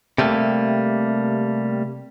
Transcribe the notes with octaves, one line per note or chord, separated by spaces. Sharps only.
C3 G3 A3 A#3